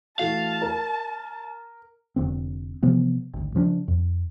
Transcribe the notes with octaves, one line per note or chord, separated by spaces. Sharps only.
E3 A3 F#4 F5 A5
A#4
F1 D3 C4
C3 E3 F3 B3
G#1 D2
C#3 F3 C4 D4
F2